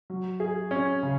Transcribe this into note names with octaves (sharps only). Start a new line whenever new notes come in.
F#3
G#4
C#4
C#3